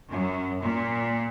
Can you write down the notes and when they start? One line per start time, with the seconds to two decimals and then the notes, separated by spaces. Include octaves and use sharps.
0.11 F#2
0.61 A#2